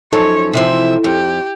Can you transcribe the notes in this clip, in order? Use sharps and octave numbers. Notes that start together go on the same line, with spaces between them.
F#2 F3 D#4 A4 C#5
C3 E3 F3 E5
F2 G4